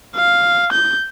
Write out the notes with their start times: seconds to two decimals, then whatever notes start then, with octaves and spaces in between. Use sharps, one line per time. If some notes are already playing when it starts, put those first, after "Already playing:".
0.15 F5
0.72 G6